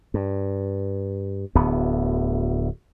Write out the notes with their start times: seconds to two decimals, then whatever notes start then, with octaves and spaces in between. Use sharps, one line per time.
0.14 G2
1.55 D1 D2 B3